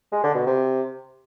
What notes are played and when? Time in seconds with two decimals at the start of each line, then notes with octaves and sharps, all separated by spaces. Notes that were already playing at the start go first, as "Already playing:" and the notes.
0.12 G#3
0.23 D3
0.35 B2
0.46 C3